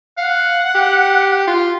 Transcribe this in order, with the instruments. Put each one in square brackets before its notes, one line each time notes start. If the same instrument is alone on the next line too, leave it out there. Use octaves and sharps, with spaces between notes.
[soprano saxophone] F5 [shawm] F#5
[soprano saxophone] G4
F4